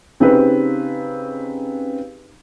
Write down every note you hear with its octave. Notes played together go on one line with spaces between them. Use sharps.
C#3 C4 D#4 G4 B4